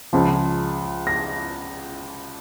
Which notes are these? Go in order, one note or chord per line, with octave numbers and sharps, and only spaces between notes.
C#2 C#3 F3
A#6